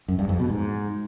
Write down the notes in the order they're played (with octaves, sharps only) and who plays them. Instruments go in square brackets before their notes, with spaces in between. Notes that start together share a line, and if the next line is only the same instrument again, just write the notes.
[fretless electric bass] F#2
G2
F2
B2
G#2